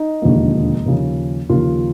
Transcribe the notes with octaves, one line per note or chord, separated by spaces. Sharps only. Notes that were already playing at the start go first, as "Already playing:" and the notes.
Already playing: D#4
E1 D#2 D3 F3 A#3
D#2 C#3 F3
D#2 C#3 F3 F4